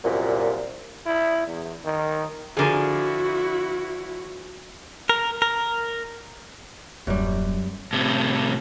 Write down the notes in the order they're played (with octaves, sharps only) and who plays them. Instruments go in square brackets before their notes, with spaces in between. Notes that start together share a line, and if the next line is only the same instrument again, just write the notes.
[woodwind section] C2 F#2 A#2
[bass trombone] E4
E2
D#3
[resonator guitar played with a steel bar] D3 F3 [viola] E4 F#4 [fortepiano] G#4 A#4 G#5
[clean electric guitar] A#4
A#4
[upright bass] D#1 [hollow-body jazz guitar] F#2 G3
[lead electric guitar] A2 C3